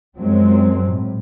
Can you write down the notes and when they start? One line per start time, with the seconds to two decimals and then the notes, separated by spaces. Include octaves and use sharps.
0.16 F#2 F3 F#3 G#3 C4
0.89 A2